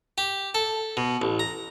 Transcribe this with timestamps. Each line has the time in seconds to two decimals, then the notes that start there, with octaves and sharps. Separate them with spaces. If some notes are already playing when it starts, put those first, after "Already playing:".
0.18 G4
0.55 A4
0.97 B2
1.22 A1
1.39 A#5